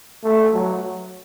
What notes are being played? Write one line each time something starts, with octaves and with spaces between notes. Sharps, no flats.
A3
F#3